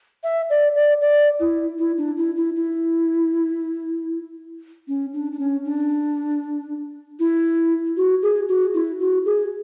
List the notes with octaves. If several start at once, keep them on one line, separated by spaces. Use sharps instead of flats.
E5
D5
D5
D5
E4
E4
D4
E4
E4
E4
C#4
D4
D4
C#4
D4
E4
F#4
G#4
F#4
E4
F#4
G#4